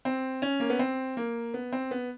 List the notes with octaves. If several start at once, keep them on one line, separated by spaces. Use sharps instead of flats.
C4
C#4
A#3
B3
C4
A#3
B3
C4
B3